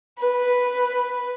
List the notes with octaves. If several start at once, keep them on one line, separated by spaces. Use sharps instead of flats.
B4